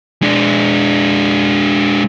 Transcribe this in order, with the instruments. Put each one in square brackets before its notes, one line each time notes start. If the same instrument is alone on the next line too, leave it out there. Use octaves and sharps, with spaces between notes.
[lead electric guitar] G#3 D4